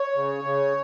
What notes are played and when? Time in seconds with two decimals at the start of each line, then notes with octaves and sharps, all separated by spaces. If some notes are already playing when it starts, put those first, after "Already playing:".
Already playing: C#5
0.16 C#3
0.44 C#3